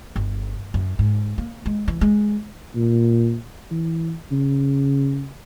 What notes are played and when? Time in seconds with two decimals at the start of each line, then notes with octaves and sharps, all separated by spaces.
0.16 G1
0.74 F#2
0.99 G#2
1.38 A#3
1.66 G#3
1.88 E3
2.01 G#3
2.75 A#2
3.71 E3
4.31 C#3